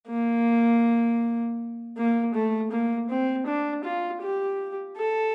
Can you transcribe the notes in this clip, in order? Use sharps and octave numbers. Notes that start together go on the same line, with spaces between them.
A#3
A#3
A3
A#3
C4
D4
F4
G4
A4